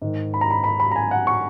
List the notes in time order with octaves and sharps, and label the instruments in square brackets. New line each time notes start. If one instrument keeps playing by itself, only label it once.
[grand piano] G#2 D#3
B5
A#5
B5
B5
B5
A#5
G#5
F#5
C#6